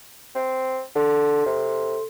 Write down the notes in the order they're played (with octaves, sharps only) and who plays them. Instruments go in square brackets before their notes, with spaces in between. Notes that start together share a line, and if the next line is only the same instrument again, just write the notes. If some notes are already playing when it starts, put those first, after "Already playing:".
[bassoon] C4
[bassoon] D3 [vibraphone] A4 C6
[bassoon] C3